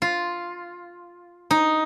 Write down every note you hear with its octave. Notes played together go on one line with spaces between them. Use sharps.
F4
D#4